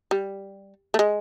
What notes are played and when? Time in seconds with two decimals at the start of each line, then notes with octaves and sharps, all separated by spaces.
0.11 G3
0.94 A3
0.99 G#3